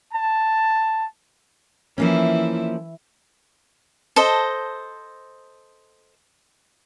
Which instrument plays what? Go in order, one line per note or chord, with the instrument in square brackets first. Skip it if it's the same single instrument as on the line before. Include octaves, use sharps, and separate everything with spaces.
[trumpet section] A5
[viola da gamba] E3 E4 [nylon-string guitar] F3 A#3 C#4
[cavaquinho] A4 C5 D#5